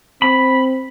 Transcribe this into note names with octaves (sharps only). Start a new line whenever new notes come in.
C4 B5